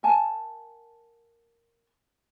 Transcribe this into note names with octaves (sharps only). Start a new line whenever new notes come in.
A#4 F#5 G#5 A5